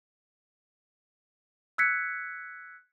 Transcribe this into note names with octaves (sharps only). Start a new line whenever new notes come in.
E6 F#6 G#6 B6 C#7